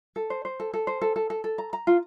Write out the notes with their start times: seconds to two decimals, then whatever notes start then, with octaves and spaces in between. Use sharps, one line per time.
0.16 A4
0.30 C5
0.45 C5
0.60 A4
0.74 A4
0.87 C5
1.01 A4
1.16 A4
1.30 A4
1.44 A4
1.58 A#5
1.73 A#5
1.87 F4